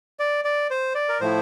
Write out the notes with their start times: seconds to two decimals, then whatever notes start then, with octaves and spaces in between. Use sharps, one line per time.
0.19 D5
0.45 D5
0.70 C5
0.95 D5
1.09 A#4
1.21 A2 F3 A3 E4 C5